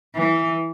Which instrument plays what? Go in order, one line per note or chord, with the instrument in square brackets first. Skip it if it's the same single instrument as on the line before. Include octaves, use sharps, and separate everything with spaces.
[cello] E3